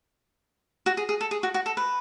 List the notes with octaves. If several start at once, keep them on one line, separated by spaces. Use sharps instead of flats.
F#4
G#4
G#4
A4
G#4
F#4
F#4
A4
B4